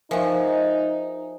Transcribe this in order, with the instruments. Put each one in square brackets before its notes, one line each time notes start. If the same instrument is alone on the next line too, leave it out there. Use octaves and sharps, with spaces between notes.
[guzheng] F3 F#4 [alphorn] D#4 [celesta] A#4 E5 G#5